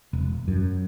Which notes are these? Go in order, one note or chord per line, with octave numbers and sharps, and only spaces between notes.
E1
F#2